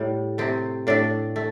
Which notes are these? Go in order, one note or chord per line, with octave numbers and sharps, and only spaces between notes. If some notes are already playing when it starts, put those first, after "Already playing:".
Already playing: A2 G3
C3 A3 C4
A2 A3 D4
A3